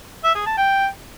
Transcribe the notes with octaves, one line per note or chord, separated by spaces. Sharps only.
E5
G#4
A5
G5